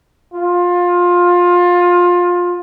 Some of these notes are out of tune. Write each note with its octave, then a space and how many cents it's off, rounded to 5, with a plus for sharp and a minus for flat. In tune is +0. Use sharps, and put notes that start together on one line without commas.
F4 +20